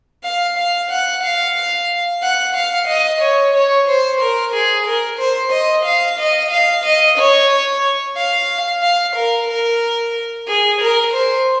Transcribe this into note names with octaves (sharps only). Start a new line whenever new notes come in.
F5
F5
F#5
F5
F#5
F5
D#5
C#5
C#5
C5
A#4
G#4
A#4
C5
D#5
F5
D#5
F5
D#5
C#5
F5
F5
A#4
A#4
G#4
A#4
C5